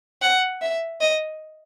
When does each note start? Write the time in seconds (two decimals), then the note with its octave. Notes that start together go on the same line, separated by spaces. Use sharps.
0.22 F#5
0.61 E5
1.00 D#5